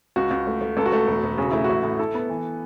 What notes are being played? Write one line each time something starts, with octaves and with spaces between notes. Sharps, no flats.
C#2 F#4
C#2
A3
A3
C#2 A4
F#4
A3 A4
E1
E1
C#3 F#4
A3 E4
A1 F#4
A2
E4 A4
B3
E3